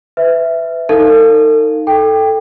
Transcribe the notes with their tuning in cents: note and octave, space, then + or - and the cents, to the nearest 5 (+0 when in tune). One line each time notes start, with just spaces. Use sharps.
B4 +25 E5 +0
D#4 +0 A4 +45 F5 +0
A4 +0 G5 +5